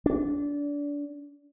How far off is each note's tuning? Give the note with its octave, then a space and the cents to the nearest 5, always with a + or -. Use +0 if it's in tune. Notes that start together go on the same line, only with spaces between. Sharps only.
D4 -25